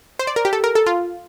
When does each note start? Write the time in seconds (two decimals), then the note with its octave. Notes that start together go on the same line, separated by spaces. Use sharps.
0.19 C5
0.27 D5
0.36 A#4
0.45 G4
0.53 A4
0.64 A#4
0.75 A4
0.87 F4